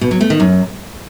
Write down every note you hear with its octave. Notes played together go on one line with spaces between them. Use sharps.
B2
F#3
A3
D#3
F#2